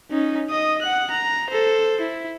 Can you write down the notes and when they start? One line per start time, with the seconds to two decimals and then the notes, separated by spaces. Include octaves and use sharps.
0.11 C#4 D#4
0.50 D#5 D#6
0.82 F#5 F#6
1.11 A#5
1.50 A4 C5
2.01 E4